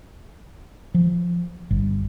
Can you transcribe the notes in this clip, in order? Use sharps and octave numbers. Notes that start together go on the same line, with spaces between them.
F3
G1